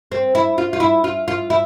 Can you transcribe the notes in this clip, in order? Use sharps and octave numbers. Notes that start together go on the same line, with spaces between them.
C4
E4
F4
F4
E4
F4
F4
E4